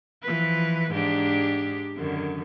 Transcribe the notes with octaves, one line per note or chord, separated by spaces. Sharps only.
E3 F3 B4
G#2 D4 G4
F#2 D3 D#3